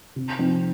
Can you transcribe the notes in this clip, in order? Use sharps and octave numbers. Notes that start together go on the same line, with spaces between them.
C3
F3 C4 D#4